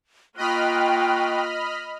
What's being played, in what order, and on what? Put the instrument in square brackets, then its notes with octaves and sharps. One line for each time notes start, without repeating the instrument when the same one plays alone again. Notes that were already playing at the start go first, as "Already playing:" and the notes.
[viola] A#3 F4 [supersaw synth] D#5 B5 F6 [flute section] G5 C#6 F#6